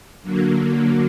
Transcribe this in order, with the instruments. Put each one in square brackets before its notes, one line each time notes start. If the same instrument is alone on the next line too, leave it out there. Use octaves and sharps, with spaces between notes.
[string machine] D3 F#3 A#3